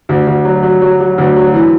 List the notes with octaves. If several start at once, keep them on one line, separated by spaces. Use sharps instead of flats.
D2
D2
F#3
F#3
F#3
F#3
D2
F#3
E3